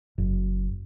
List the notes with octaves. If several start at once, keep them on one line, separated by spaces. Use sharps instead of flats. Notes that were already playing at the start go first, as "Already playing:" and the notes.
F#1